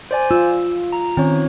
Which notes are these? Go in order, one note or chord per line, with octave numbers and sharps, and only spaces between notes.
C5 D5 G#5
F4 E6
A#5
D#3 C4 C#4 C#5